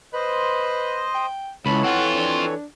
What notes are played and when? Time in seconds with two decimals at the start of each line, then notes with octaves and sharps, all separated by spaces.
0.14 B4 C5 D#5
1.14 G5
1.66 C#2 E3 A4 C#5 B5
1.84 C4 F4 F#5
2.16 D4